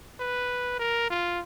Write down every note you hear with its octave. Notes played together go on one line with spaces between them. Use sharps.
B4
A#4
F4